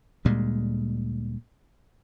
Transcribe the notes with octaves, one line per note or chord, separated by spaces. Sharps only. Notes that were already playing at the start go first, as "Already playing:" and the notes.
D2 A#2 G3 G#3